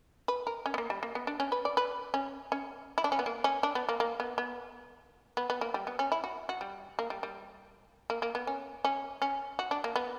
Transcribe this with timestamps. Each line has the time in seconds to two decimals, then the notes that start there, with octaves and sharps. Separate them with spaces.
0.28 B4
0.47 A#4
0.66 C#4
0.74 B3
0.78 A#3
0.90 G3
1.03 A#3
1.15 B3
1.27 D4
1.40 C#4
1.52 B4
1.65 D5
1.77 B4
2.14 C#4
2.52 C#4
2.98 E4
3.04 D4
3.12 C#4
3.19 B3
3.26 A#3
3.44 C#4
3.63 D4
3.75 B3
3.89 A#3
4.00 A#3
4.20 B3
4.38 B3
5.37 B3
5.50 B3
5.61 A#3
5.74 G3
5.87 B3
5.99 C#4
6.12 E4
6.24 F#4
6.49 F#4
6.61 G3
6.99 A#3
7.10 G3
7.23 G3
8.10 A#3
8.22 A#3
8.35 B3
8.47 C#4
8.85 C#4
9.22 C#4
9.59 F#4
9.71 D4
9.84 A#3
9.96 B3